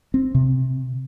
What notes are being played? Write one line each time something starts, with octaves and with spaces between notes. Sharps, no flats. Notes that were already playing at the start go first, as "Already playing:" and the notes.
C4
C3